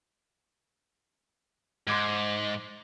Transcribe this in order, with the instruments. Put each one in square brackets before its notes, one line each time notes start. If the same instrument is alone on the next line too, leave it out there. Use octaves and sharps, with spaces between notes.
[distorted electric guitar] G#2 [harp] C6 D6 G#6